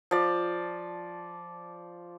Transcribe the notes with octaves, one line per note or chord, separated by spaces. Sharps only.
F3 D5